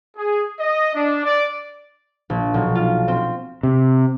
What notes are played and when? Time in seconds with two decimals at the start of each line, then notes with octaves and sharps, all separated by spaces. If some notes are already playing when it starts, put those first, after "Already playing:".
0.17 G#4
0.59 D#5
0.94 D4
1.25 D5
2.30 A#1
2.54 B1
2.75 F4
3.08 C4
3.63 C3